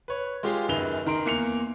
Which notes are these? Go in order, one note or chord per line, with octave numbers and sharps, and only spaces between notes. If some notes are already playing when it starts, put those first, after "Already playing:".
B4 C#5
G#3 F4 G4 G#4
F#1 F#2 D#3 B4 F7 G7
D#3 A#5 C6 D7
E2 A#3 C#7 F7